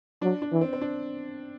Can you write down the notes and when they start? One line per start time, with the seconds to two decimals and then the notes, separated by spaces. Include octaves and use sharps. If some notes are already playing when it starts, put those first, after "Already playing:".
0.22 F#3 D4
0.42 D4
0.52 E3
0.61 C4
0.73 C4
0.81 D4